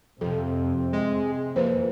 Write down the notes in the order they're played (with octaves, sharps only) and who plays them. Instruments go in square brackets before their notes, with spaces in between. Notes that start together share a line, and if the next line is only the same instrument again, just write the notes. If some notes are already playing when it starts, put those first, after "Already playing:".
[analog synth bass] F2 [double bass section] C3 C4 [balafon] A4
[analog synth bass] G#3
[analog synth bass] F2 [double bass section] E3 A#3 [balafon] B4 C5